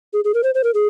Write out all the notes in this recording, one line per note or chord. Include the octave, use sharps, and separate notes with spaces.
G#4
G#4
A#4
C5
C5
A#4
G#4